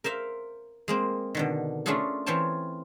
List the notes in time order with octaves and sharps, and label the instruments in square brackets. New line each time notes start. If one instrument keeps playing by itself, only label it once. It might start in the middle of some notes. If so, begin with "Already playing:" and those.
[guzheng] A#4 C5 E5 F5
G#3 A#3 C4
B2 D3 D#3
A3 C#4 D4 F4 G#4 A4
E3 C4 F4 C#5 G5 A5